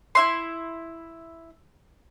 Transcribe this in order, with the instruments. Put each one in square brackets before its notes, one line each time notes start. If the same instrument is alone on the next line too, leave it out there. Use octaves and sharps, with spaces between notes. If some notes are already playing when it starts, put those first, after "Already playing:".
[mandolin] E4 E5 C6